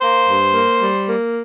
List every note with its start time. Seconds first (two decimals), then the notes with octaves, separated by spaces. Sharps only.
0.01 A#3 C5
0.28 G2
0.54 A#3
0.81 G3
1.08 A#3